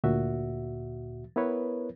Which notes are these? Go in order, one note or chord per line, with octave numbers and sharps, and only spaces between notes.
D2 A#2 F#4 E5
B3 E4 A#4 B4 C#5